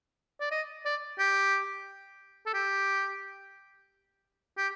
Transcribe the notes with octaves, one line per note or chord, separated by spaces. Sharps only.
D5
D#5
D5
G4
A4
G4
G4